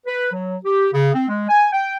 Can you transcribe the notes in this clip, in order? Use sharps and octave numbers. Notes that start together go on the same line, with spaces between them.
B4
F#3
G4
C#3
C4
G#3
G#5
G5